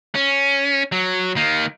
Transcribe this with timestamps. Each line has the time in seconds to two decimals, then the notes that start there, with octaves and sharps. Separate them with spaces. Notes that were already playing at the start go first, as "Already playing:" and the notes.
0.15 C#4
0.92 F#3
1.36 D#3 A#3